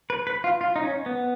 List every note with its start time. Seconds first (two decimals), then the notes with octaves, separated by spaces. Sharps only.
0.10 B4
0.27 B4
0.44 F4
0.61 F4
0.76 D#4
0.83 C#4
1.06 B3